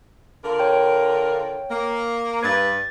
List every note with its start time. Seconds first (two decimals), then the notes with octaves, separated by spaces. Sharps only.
0.44 D3 F4 A#4
0.60 C#5 G5
1.70 A#3
2.43 G2 B4 G#6 A6